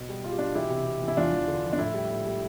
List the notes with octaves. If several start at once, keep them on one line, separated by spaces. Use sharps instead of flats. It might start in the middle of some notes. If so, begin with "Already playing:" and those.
Already playing: B2
G3
B2 F4
G4
B2 D4 F4
E3 E4 G4
C3
C3
E3
E4
E2 D4 F4
E2
D3
F3
D4
A2 E4
G3
A2
G3